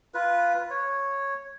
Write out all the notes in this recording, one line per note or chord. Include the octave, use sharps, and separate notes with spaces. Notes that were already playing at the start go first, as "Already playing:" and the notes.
F4 B4
C#5